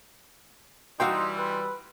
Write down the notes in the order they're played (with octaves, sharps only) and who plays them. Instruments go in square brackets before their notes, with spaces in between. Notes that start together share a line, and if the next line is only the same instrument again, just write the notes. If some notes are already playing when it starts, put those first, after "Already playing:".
[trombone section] E3 G3 [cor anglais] D#4 [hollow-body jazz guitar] F#4 F5 G5 [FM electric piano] C6 E6
[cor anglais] B4